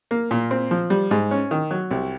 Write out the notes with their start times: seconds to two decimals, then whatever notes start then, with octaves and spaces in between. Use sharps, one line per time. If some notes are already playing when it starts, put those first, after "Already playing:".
0.11 A#3
0.31 A#2
0.51 C4
0.71 F3
0.90 G3
1.11 G#2
1.31 C#4
1.51 D#3
1.71 F#3
1.91 C2